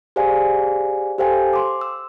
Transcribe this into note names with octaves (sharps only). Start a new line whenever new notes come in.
G4 G#4 C5 D5 F5 G#5
G4 A4 C5 F5 G5 G#5
C6 D6
E6